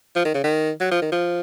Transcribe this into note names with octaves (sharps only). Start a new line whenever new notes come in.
F3
D#3
C#3
D#3
F#3
F3
D#3
F3